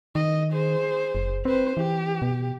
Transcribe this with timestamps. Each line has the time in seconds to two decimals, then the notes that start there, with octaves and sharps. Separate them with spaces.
0.15 D#3 D#5
0.51 G#4 C5
1.15 F#1
1.45 C4 B4 C5
1.77 E3 G4
2.22 B2